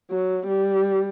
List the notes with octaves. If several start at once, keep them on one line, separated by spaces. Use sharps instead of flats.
F#3
G3